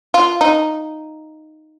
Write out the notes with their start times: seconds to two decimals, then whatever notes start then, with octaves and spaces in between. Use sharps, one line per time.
0.14 F4
0.41 D#4